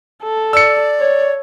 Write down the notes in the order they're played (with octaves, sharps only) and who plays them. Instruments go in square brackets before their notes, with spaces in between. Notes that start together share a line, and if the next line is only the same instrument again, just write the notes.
[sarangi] A4
[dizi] D5 [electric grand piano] E6 C#7
[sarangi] C#5